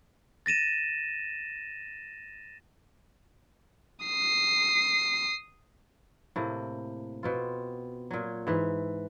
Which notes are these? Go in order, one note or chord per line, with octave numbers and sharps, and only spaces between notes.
A6 A#6 D#7 E7
D#6 C7
A2 C3 A#3
B2 C4 F4
A#2 F#3
G#2 E3 E5